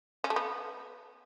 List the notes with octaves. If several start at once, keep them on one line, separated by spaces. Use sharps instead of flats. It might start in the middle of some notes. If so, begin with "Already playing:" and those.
C#4
A3
B3